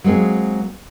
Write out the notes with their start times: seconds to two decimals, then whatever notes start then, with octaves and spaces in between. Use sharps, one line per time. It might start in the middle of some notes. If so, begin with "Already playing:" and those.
0.04 F#3 G#3 A#3 C4 G#4